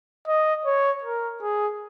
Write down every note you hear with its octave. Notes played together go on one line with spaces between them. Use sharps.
D#5
C#5
A#4
G#4